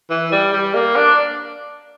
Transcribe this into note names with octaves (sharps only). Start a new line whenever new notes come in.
E3
G3
G3
A#3
D4